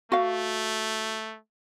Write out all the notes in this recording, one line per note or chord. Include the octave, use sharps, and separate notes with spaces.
A3 F#4 F5